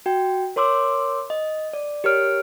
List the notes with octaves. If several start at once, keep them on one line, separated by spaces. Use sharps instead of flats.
F#4 G5
A#4 C#5 C6 D6 E6
D#5
D5
G4 A#4 C#5 F6 D7